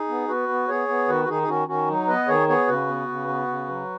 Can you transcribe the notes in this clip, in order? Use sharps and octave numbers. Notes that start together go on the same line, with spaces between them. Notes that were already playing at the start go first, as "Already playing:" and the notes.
Already playing: D#4 G#4
B3
B3 F#4 B4
B3
B3 G#4 C#5
B3
D#3 F#4 B4
F#4
D#3 D#4 G#4
G#4
D#3 C#4 F#4
D#3 C#4 F#4
F#3 D#4
B3 B4 D#5
D#3 G#4 C#5
B3 G#4 C#5
C#3 F#4 B4
B3
C#3
B3
C#3
F#3